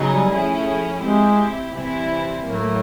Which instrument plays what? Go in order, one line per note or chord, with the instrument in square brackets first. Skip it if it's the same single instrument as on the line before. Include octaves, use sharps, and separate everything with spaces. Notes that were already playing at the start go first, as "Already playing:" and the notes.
Already playing: [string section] C#3 F#3 B3 D#4 G#4
[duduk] G3
[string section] F3 A3 C#4 E4 G#4
[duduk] G#3 [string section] C4 E4 G4
[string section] C3 E3 G3 C4 E4
[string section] A2 F#3 A#3 [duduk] A3